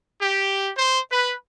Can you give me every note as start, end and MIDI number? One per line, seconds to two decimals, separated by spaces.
0.22 0.71 67
0.77 1.01 72
1.12 1.35 71